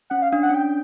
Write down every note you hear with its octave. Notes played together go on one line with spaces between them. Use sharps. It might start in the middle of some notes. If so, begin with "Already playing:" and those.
C#4 F#5
F5
D4 F5
F#5
C#4
D4 G5